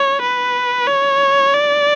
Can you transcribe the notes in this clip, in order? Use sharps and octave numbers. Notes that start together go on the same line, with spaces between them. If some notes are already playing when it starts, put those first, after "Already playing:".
Already playing: C#5
B4
C#5
D5